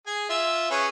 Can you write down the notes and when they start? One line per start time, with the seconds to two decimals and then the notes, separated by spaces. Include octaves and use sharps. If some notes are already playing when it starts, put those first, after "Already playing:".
0.07 G#4 G#5
0.30 F4 E5
0.71 C#4 G#4 B4